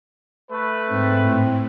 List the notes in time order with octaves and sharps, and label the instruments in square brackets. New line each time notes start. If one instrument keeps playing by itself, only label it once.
[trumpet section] A3 B4
[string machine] G#2 [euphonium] C4
[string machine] A2